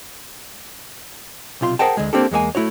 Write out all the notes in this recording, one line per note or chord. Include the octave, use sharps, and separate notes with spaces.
B1 C3 F4 A#5 C6
G#4 A#4 C5 F#5 G5 A5
D2 G#3
A#3 C4 D4 G4 A4
E2 G#3 A#3 G#5
A3 E4 F#4 C#5